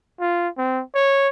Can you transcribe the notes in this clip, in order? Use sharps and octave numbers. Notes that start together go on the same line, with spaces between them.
F4
C4
C#5